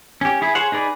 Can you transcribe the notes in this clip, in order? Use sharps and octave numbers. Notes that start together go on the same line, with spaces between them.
C#4 G4
E4 G#4
G#4 C5 C#5 F#5
D#4 G#4 B4 D5